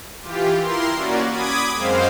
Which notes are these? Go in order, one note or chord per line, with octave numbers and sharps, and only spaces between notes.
E3 F4 G4
E4 A#4 C6
A#3 C#4 F#4 D5
B5 D6 D#6 G#6
F#2 G#3 C4 C5 F5